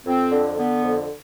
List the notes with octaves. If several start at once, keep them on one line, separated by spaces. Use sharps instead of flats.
F2 C4
D3
D3 B3
F2